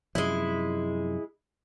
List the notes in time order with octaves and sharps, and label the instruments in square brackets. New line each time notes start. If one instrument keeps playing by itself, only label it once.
[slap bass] F#2 C3 F3 [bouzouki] G#3 E4